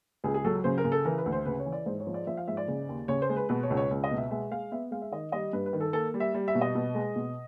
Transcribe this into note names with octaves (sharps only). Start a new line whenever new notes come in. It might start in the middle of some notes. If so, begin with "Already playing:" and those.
C#2 G#4
G#4
F#3 A4
C#3 C5
A#4
C#3
A4
E3 A#4
B4
D2
C5
C#3 B4
C#5
E3
D5
G#2 C5
C#5
F3
D5
F3 E5
F5
G#2 E5
D5
C#3
D#2
C#3 C#5
C5
G#3
B4
B2 B4
C#5
C#2
C#5
C#2
D#5
B2
E5
G#3 E5
G#3 F5
B3 E5
G#3 F5
E5
D#3 D#5
G3 D#5
G2 B4
B4
D#3
A4
A#3 A4
G3
E5
G3
E5
B2
D#5
B2
G#3
B2